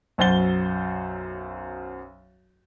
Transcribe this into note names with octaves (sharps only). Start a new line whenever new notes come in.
B1 F#2 C5 F#5 A6 G7